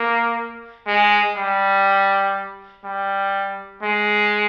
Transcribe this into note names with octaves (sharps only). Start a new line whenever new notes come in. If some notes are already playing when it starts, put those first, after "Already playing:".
Already playing: A#3
G#3
G3
G3
G#3